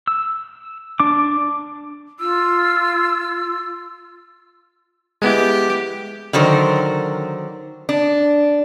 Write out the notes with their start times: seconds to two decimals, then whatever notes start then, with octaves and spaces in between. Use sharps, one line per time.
0.07 E6
1.00 D4 D6
2.20 F4 E6
5.22 G#3 B3 E4 G4
6.33 D3 D#3 F#3 A#4 C5
7.89 D4